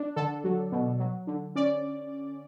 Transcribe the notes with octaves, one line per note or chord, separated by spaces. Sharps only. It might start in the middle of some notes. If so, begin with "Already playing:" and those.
Already playing: D4
D3 A4
F#3
B2
F#3
D3
C#4 D5